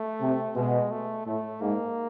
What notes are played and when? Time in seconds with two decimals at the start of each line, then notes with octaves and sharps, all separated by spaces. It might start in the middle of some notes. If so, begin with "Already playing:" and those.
Already playing: A3
0.21 C3
0.56 B2 G#3
0.91 A3
1.26 A2 A3
1.61 G#2 A#3